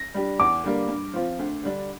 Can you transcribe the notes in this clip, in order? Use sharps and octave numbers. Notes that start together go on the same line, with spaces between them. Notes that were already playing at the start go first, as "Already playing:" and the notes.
Already playing: A#6
G3 D4 G4
E2 D6
D3 G3 A#3
G2
F3 C4 F4
D2
D3 G3 D4